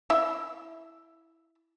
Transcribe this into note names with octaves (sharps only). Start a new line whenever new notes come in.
E4 E5